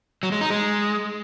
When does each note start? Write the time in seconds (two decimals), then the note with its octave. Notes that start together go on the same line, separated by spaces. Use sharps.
0.23 F#3
0.32 G#3
0.41 D#4
0.50 G#3